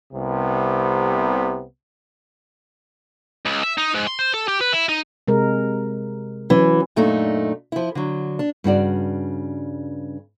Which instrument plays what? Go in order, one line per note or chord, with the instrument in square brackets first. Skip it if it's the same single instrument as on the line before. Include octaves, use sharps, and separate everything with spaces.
[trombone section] C2 C3 B3
[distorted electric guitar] C#2
E5
D#4
G#2
C6
C5
A4
G4
B4
E4
D#4
[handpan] C3 G#3 A#4
[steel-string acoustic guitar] E3 [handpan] F#3 C#4
[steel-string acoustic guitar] F#2 A#2 A3 D4 D#4
F3 E4
D3 F#3
D4
[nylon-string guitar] G2 C#3 F#4 D5